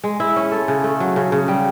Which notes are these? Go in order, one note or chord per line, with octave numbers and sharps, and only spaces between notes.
G#3
E4
C#4
A4
C#3
A3
F#3
C#3
C#3
G3